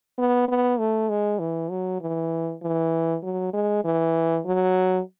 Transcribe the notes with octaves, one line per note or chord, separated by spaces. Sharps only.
B3
B3
A3
G#3
E3
F#3
E3
E3
F#3
G#3
E3
F#3